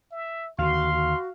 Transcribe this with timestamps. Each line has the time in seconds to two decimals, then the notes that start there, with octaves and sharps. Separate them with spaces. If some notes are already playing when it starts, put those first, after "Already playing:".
0.12 E5
0.58 D#2 D3 F#4 F5 C6
0.93 F#4